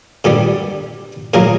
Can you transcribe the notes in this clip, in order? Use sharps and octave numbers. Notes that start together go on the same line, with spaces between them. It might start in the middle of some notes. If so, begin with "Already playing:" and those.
A#2 G3 B3 D4 G4 A4
A#2 F#3 A#3 G#4 A#4